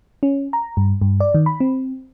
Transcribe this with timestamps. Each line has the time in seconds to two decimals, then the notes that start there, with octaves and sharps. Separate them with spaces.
0.23 C#4
0.53 A#5
0.77 G2
1.02 G2
1.20 D5
1.35 D#3
1.46 B5
1.60 C4